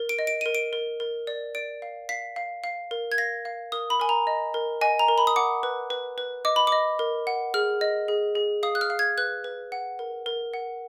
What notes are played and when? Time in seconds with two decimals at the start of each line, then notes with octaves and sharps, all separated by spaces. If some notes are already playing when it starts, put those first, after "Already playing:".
Already playing: A#4
0.09 D7
0.19 D#5
0.27 D7
0.41 A#4 D#7
0.55 D7
0.73 A#4
1.00 A#4
1.27 D5
1.55 D5 D7
1.82 F5
2.09 F5 B6
2.36 F5
2.64 F5
2.91 A#4
3.12 G#6
3.18 F5 A#6
3.45 F5
3.72 A#4 D#6
3.90 B5
4.00 A#4 G#5
4.09 A#5
4.27 D#5
4.54 A#4
4.81 D#5 G#5
4.99 A#5
5.08 A#4
5.18 B5
5.27 D#6
5.36 F#5 D6
5.63 B4
5.90 B4
6.18 B4
6.45 D#5 D6
6.56 B5
6.67 D#5 D6
6.99 A#4
7.27 F#5
7.54 G#4 F6
7.81 D#5
8.08 G#4
8.35 G#4
8.63 F5 D#6
8.75 F#6
8.81 F6
8.90 F5
8.99 G#6
9.18 B4 F#6
9.44 B4
9.72 F#5
9.99 A#4
10.26 A#4
10.54 F#5